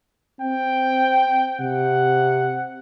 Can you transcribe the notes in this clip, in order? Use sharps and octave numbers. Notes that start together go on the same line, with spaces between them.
C4 G5
C3 F#5